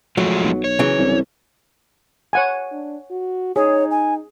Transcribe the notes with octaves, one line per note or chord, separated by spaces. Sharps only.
F3 F#3 G#3 A3
B1
C#5
C#3 E3 F#3
C2
C#5 F#5 G#5
D4
F#4
D#4 G#4 C#5
G#5